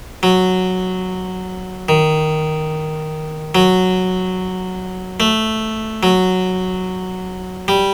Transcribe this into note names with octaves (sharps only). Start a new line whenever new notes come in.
F#3
D#3
F#3
A3
F#3
G3